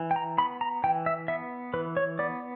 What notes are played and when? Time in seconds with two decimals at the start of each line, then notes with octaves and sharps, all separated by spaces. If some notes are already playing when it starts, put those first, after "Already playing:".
Already playing: E3
0.11 G5
0.16 A#5
0.38 B3 B5
0.61 A#5
0.84 E3 G5
1.06 E5
1.28 B3 E5
1.73 E3 B4
1.97 C#5
2.19 B3 D5